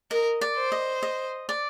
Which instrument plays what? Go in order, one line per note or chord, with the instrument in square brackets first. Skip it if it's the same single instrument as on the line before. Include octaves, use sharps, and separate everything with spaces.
[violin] A#4 [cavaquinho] D#5
[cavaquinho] D5
[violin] C5
[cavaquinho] D#5
D#5
D5